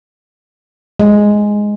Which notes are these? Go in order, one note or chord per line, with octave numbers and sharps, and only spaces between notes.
G#3